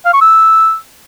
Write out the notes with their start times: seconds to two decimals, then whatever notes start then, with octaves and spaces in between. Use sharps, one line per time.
0.05 F5
0.13 C#6
0.22 E6